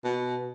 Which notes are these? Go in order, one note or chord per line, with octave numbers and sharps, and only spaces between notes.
B2